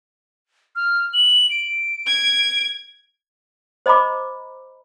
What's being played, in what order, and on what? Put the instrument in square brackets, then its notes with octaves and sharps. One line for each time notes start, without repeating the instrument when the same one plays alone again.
[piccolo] F6
F#7
D7
[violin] G#6
[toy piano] C5 D#5 A#5 B5 D6